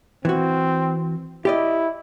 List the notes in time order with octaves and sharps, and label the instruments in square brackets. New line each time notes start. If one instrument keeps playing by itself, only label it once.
[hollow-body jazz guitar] E3 F#4 [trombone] C4
[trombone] E4 [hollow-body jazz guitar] G4 D5 D#5